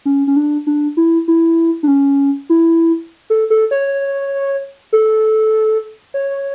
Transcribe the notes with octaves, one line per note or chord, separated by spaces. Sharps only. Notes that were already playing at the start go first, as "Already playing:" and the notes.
C#4
C#4
D4
D4
E4
E4
D4
C#4
E4
A4
A4
C#5
A4
C#5